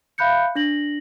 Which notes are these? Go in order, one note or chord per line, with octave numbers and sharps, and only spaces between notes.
E5 F5 B5 F#6 G6 C#7
D4 A#6 F#7